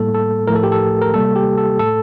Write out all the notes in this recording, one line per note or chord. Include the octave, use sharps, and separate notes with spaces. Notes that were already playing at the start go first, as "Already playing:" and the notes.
Already playing: A2 G3 A#3 A4
A4
A2 F3 A3 A#4
A4
G4
A4
A#4
C3 G3 A#3 A4
G4
A4
A2 A3 A4